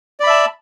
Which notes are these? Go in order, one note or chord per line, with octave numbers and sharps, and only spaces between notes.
D5 E5 A5 B5